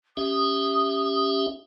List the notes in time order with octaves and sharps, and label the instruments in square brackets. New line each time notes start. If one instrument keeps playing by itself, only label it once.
[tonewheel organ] C#4 G4 E5 [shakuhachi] D#6